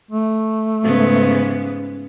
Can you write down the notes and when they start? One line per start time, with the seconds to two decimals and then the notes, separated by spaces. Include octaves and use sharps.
0.11 A3
0.83 G#2 C#3 B3